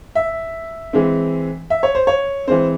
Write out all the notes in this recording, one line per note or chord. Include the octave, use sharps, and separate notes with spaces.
E5
E3 G#3 C4
E5
C#5
C5
C#5
E3 G#3 C4 C5